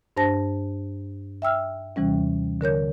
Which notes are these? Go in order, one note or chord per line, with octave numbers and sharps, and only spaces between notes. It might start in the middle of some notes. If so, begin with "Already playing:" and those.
G2 D4 C5 A5 A#6
E5 G5 E6 F6
D#2 C3 E3 G3 C#4
D3 A#4 C#5 G6